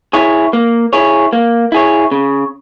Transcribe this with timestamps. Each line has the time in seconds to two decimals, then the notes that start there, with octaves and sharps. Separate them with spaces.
0.13 E4 G#4 C#5
0.53 A#3
0.93 E4 G#4 C#5
1.33 A#3
1.72 E4 G#4 C#5
2.11 C#3